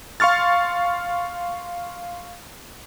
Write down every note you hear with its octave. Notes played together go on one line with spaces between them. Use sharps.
F5 C6 C#6 F6 A6